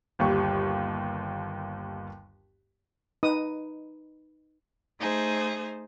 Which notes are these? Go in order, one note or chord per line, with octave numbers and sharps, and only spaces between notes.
G1 D#2 G3 C#6
D#4 B4 D#6
A3 D#4 G#4 C5